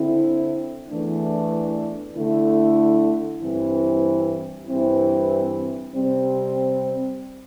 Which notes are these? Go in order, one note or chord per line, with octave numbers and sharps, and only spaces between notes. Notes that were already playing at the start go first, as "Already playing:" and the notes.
Already playing: D3 C4 E4
E2 E3 A3 D4
D3 A3 E4
G2 E3 C4 E4
G2 E3 C4 E4
C3 G3 C4